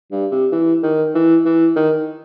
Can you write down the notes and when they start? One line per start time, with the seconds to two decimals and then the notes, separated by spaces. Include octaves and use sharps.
0.11 G2
0.31 C3
0.52 E3
0.83 D#3
1.15 E3
1.45 E3
1.76 D#3